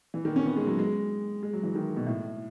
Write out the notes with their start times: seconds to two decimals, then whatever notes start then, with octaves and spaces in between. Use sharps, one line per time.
0.14 E3
0.25 D#3
0.36 C#4
0.46 B3
0.57 G#3
0.67 F#3
0.79 G#3
1.43 G#3
1.53 F#3
1.63 E3
1.75 D#3
1.96 B2
2.07 A2